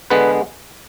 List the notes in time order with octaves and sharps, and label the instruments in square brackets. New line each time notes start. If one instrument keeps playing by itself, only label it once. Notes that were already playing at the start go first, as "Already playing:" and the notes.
[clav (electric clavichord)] D3 G#3 B3 B4